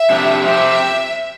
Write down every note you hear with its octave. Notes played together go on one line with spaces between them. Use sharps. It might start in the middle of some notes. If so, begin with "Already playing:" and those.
Already playing: E5
F2 C3 G3 D4 G4
F3 C4 G4 E5